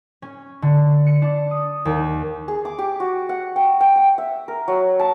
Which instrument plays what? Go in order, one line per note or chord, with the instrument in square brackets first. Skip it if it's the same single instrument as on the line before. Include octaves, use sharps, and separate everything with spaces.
[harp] C#4
D3
C#7
D4
D#6
D#2
[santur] G#4
D6
G4
F#4
F#5
G5
G5
F#5
E5
A#4
F#3
A5